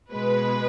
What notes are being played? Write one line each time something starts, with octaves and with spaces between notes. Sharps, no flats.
B2 G#3 B4